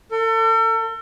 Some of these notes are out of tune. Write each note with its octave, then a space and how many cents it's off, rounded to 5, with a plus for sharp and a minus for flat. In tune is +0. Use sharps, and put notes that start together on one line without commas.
A4 +40